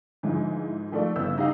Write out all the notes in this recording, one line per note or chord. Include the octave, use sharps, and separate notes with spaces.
G#2 D3 E3 F3 G#3 E4
D#3 F3 A3 F4 A4 D5
G1 C#3 B3 E4 E6 G6
D#4 G4 F5 F#5